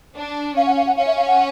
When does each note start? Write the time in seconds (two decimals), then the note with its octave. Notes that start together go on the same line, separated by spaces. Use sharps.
0.16 D4
0.57 C#4 F5
0.67 F#5
0.77 F5
0.87 F#5
0.97 C#4 F5
1.07 E5
1.17 F5
1.27 F#5